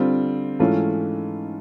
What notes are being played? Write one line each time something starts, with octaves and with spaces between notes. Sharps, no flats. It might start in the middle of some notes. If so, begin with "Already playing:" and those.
Already playing: D3 G3 C4 F4
G#2 E3 A3 C#4 F4